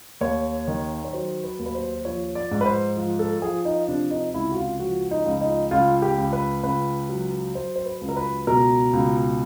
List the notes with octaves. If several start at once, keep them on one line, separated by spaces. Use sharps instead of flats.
D#2 C#5
D#3
C#5
F#3 C5
B4
D#2
B4
C5
F3 C#5
D5
G#2
B4
C5
F3
A4
F3 G#4
D#4
C3 D4
D#4
C#2 E4
F#4
F4
F3 F#4
D#4
C#2
D#4
C#2 F4
G4
C#2
B4
C#2 B4
F#3
F#3 C5
C5
B4
C#2
A#4
B4
B2 A#4
C#2